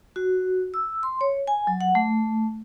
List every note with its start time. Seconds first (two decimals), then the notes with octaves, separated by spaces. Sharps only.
0.16 F#4
0.74 E6
1.03 C6
1.21 C#5
1.47 G#5
1.67 F#3
1.81 F#5
1.95 A3